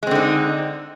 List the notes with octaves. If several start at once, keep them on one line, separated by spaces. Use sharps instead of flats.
D3 G#3 C4 D#4